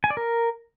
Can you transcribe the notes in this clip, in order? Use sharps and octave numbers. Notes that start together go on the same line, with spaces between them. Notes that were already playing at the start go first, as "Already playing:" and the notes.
G#5
D5
A#4